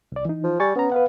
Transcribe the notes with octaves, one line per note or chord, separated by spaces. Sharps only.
C2 D5
E3 D#4
F3
G3 G#5 C#6 A6
B3 C#4 A#5
B4 F5 F#5